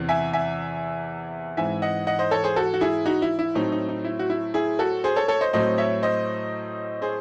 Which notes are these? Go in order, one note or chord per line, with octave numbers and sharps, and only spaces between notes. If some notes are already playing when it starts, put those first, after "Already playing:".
Already playing: E2 C3 E3
E5 G#5
E5 G#5
G#2 E3 C4 E5 G#5
D#5 F#5
D#5 F#5
C5 D#5
A4 C#5
G#4 C5
F#4 A4
F#4
E4 G#4
D#4 F#4
E4
E4
A2 F#3 A3 C4 D#4
D#4
D#4
E4
F#4
E4
E4 G#4
F#4 A4
G#4 C5
A4 C#5
A4 C#5
C5 D#5
A2 F#3 A3 C4 C5 D#5
C#5 E5
C5 D#5
G#4 C5